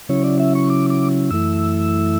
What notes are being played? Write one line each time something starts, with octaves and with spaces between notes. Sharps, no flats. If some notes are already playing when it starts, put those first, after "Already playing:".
C#3 F#3 C#4 E4 C#5
D5
E5
C#6
D6
D6
F#2 E3 A3 E4 E6